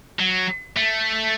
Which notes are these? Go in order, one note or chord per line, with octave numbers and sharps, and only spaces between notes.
F#3
A3